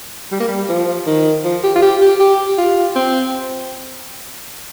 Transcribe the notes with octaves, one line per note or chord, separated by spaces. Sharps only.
G3
A#3
G3
F3
D#3
F3
G4
F4
G4
G4
G4
F4
C4